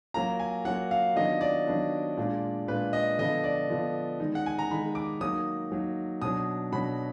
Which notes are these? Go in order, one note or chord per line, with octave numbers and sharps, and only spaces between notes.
F#3 A#3 F4 A#5
G#5
F#3 A#3 F4 F#5
F5
D#3 F#3 B3 D4 F4 D#5
D5
D#3 F#3 B3 D4 F4
A#2 G#3 D4 F4
A#2 G#3 D4 F4 B4
D#5
D3 F3 B3 F4 D#5
D5
D3 F3 B3 F4
D#3 G#3 D#4
F#5
G#5
A#5
D#3 G#3 D#4 B5
D6
F#3 A#3 D#4 D#6
F#3 A#3 D#4
B2 F#3 D4 D#6
B2 F#3 D4 B5